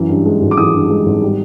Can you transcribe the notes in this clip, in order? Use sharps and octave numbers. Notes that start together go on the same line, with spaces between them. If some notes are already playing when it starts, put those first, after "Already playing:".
Already playing: F#2 E3
G2
G#3
G#1
D6
E3 D#6
G2
G#3
G#1
G3